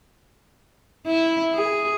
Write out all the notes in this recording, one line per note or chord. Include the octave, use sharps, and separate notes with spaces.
E4
G#4